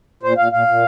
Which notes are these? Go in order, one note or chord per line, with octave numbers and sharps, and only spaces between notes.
A#2 C5
A#2 F5
A#2 F5
A#2